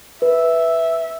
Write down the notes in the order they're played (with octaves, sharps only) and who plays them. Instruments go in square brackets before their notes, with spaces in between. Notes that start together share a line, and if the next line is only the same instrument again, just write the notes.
[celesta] B4 [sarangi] E5